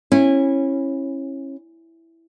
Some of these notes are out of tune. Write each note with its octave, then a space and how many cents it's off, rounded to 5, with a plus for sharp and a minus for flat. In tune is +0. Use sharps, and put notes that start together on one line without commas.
C#4 -25 E4 +0